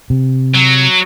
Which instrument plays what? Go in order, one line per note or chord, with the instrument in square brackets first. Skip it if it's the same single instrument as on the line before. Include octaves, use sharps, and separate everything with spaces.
[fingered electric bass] C3
[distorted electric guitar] F#3